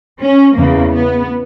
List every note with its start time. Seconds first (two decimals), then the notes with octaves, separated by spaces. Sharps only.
0.19 C#4
0.56 E2 C#3 E3 A#3
0.92 B3